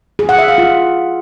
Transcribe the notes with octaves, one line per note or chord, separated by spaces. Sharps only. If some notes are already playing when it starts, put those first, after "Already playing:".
G#4
F#5
E5
F5
F4